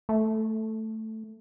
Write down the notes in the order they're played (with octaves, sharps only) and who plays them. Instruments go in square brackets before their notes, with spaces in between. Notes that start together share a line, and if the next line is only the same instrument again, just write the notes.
[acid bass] A3